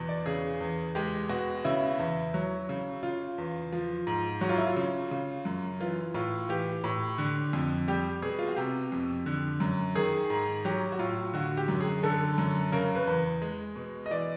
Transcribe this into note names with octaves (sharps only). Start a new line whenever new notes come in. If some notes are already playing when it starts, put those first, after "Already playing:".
Already playing: E2 B2
D5
C#3 G#4
E2
G#3 G4
B2 F#4
C#3 E4
E2
F#3
C#3
C#3 F4
E2
F3
G#2
F#3 F#4
F4
E4
F4
C#3
C#3
F#2
E3 F4
A2 F4
E3 G4
A2
D3
F2
G3 G4
B2 G#4
F4
F#4
C3 G4
F2
D3
F#2
D#3 G#4
G#2
F#3 G4
F#4
A2 F4
D3 F#4
G4
F#2
G#4
D3 A4
F#2
C#3 A#4
B4
E2
G#3
B2
D#5
E3 D5